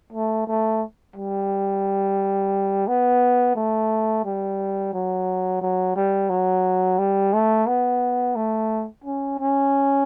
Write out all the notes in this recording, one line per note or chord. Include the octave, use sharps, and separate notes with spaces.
A3
A3
G3
B3
A3
G3
F#3
F#3
G3
F#3
G3
A3
B3
A3
C#4
C#4